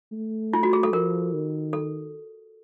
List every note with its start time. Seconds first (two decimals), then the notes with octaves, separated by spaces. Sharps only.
0.12 A3
0.53 F4
0.63 F#4
0.73 G#4
0.83 A4
0.93 F3 A#4
1.33 D#3
1.73 A4